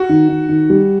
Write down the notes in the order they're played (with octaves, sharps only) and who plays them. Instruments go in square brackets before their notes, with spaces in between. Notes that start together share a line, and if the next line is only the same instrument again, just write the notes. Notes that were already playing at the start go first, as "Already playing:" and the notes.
Already playing: [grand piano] F#4
[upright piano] D#3
D#3
D#3
G3